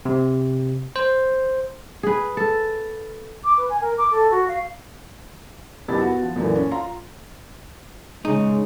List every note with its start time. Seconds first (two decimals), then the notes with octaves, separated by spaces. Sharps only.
0.05 C3
0.96 C5
2.03 G#4 B4
2.37 A4
3.44 D6
3.57 B4
3.69 G#5
3.81 A#4
3.98 D6
4.11 A4
4.31 F#4
4.48 F5
5.88 B1 F#2 B2 E4 G4 A6
6.01 B3 F#4
6.22 F3
6.36 F#2 A#2 D3 E3
6.55 C#4
6.71 F4 A#5 C6
8.25 C#3 G#3 D#4